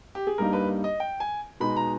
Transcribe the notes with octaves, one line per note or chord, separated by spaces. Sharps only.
G4
G#4
G2 G3 A#3 D#4 A#4
B4
D#5
G5
G#5
B2 G#3 D#4 B5
A#5